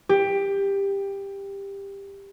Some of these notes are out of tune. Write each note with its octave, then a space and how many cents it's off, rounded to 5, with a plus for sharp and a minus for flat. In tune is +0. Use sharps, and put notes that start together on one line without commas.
G4 +15